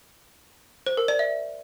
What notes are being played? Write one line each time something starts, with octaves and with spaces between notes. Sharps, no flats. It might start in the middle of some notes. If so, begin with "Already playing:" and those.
C5
A#4
D5
E5